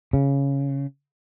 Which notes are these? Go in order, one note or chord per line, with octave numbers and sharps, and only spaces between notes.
C#3